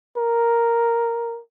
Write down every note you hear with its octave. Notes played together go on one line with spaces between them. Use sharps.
A#4